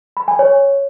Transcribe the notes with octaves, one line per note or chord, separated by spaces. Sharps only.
B5
G#5
C#5